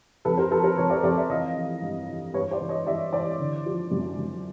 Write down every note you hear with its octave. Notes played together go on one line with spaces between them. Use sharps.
F2 A4 B4
A#4 C5
F3 A4 B4
A#4 C5
F2 B4 C#5
C5 D5
F2 C5 D5
D5 E5
E3 D#5 F5
E3
G2
E3
G2 B4 C#5
C5 D5
E3
C#5 D#5
E3 D5 E5
E3 C5 D5
D3
F3
F#2
F#2